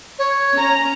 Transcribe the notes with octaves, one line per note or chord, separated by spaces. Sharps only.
C#5
C#4 A#5